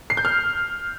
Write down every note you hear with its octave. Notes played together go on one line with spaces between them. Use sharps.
C7
G6
F6